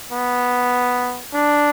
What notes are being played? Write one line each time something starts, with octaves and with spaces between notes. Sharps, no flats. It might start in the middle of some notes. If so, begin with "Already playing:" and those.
B3
D4